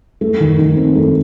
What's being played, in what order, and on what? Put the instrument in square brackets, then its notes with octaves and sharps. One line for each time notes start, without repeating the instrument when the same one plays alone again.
[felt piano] A3
D#3
D#3
C4
A3